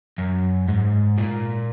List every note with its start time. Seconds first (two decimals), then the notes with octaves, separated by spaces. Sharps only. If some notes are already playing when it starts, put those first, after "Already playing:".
0.18 F#2
0.68 G#2
1.18 A#2